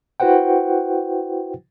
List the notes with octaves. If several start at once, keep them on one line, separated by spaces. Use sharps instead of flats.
E4 F#4 B4 C5 F#5 G5